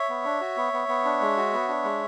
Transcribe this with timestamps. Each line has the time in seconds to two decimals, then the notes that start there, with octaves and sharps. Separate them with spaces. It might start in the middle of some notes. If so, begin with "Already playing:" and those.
Already playing: C#5 E5
0.09 B3
0.25 D4
0.41 F#4
0.57 B3
0.73 B3
0.88 B3
1.05 D4
1.21 G#3
1.37 F#4
1.53 B3
1.68 D4
1.84 G#3